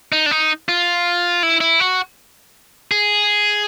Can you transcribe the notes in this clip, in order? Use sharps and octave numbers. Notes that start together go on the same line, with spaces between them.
D#4
D4
D#4
F4
E4
E4
F#4
G#4